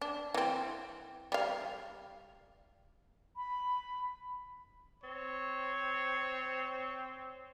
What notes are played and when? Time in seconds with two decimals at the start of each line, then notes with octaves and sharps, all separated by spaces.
0.01 D4
0.34 E3 C4
1.32 G3 F5
3.37 B5
5.03 C4 C#5